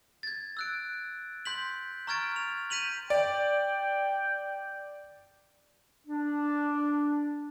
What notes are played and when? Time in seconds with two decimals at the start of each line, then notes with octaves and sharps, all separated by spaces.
0.23 G#6 A6
0.57 E6 F#6 D7
1.45 C6 G6 B6 F#7
2.07 A#5 C#6 F6 G#6 A6 D7
2.36 F7
2.70 G6 B6 D#7 F7 F#7
3.10 D5 G5
6.07 D4